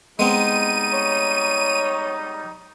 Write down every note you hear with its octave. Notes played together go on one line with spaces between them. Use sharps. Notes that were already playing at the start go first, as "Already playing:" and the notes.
G3 G#3 B3 C4 D#4 D#7
C#5